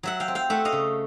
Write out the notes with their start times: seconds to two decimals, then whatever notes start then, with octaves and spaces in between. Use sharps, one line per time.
0.03 F#3 E5 F#5
0.20 F5 G5
0.28 C4
0.35 F5 G5
0.50 A3 E5 F#5
0.65 D#5 F5
0.72 C#3